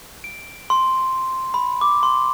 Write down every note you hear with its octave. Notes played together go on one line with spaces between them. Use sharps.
D7
C6
B5
D6
C6